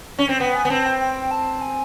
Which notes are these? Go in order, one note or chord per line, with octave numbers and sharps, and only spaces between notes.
C#4
C4
B3 G5
G#5
B3
C4 A5
G5
G5
A5
G#5